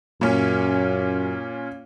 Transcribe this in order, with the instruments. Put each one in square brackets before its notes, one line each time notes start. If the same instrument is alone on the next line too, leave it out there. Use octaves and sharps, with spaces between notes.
[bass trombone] F#2 [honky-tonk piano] A#2 C#4